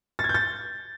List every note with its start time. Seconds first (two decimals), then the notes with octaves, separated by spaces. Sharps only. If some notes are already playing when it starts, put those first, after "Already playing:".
0.19 A6
0.24 G#6
0.29 G6
0.34 A6